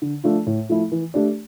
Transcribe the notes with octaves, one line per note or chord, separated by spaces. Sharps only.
D3
F3 A3 D4 F4
A2
F3 A3 E4
E3
A3 D4 G4 D5